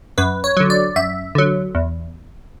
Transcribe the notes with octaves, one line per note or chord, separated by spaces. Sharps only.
F#2 B4
C#5
D3 F#3
D5
F#2 E5
D3 F#3
E2